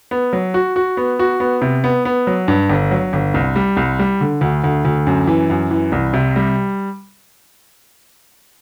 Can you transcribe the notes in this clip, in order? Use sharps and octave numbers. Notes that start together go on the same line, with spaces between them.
B3
F#3
F#4
F#4
B3
F#4
B3
C3
B3
B3
F#3
G2
G1
F#3
G1
C2
G3
C2
G3
D3
D2
D2
D2
F#2
E3
F#2
E3
C2
C3
G3